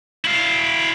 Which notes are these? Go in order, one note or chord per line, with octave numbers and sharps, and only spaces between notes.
E4 F5